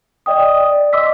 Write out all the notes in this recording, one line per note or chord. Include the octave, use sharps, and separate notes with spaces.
D5 D#5 G5 D#6
D5
D#5 C6 D6 E6 B6